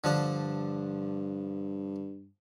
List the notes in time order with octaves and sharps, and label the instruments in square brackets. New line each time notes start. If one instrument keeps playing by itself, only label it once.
[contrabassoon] G2 [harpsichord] D3 F3 D4